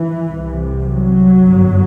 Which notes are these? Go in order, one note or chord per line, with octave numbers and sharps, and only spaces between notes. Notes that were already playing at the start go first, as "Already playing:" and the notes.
Already playing: E3
C2 C3
F#3
G1 F#2